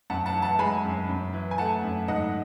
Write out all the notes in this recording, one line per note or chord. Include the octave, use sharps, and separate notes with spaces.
F#2 F#5 A5
F#5 A5
E3
F#5 A5
G#3 G#5 B5
F#2
F#2
E3
G#5
A3 F#5 A5
F#2
G#2 D#5 F#5